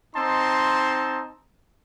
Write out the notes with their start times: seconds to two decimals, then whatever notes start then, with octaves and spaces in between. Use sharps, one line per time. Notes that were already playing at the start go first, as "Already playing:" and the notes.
0.15 C4 D#4 A5 C6